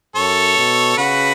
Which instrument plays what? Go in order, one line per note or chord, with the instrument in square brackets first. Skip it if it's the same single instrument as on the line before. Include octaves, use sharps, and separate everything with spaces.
[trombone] F#2 [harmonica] A4 C#5
[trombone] B2
[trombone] C#3 [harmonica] F#4 B4